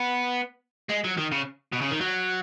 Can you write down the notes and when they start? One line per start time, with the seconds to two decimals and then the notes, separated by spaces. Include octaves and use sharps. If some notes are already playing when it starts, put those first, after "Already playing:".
Already playing: B3
0.90 G#3
1.05 F#3
1.18 D#3
1.32 C#3
1.72 B2
1.81 C#3
1.91 D#3
2.00 F#3